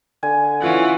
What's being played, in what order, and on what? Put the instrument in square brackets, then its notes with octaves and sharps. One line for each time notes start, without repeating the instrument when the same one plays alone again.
[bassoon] D3 [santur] G#5
[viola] E3 [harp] C#4 F4 F#5